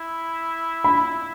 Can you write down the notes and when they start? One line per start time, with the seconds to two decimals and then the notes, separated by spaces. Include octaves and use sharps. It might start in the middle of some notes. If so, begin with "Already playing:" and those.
Already playing: E4
0.84 B5